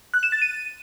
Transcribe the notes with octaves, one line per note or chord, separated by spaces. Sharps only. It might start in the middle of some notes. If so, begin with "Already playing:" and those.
F#6
E7
A6
D#7